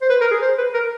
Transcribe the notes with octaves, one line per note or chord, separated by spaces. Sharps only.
C5
B4
A#4
G#4
C5
B4
A#4